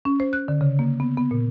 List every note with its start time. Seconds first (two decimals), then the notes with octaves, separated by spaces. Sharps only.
0.05 C#4
0.20 C5
0.33 F#6
0.48 D3
0.61 C#3
0.79 A#3
1.00 B3
1.17 B3
1.31 A#2